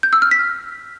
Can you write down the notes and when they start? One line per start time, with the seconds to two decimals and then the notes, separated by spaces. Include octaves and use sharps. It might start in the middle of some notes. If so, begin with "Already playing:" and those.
0.03 G6
0.13 E6
0.22 F6
0.31 B6